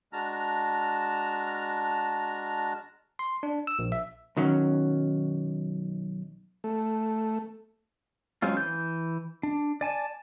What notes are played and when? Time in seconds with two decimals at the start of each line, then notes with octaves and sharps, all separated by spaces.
0.13 G#3 D4 F#4 A5 A#5 F6
3.19 C6
3.43 D4
3.67 E6
3.79 A#1
3.92 E5
4.37 B1 D#3 F#3 C#4
6.64 A3
8.42 F#3 G#3 C4 C#4 F4
8.57 E3 G6
9.43 D4
9.81 D5 G#5 A5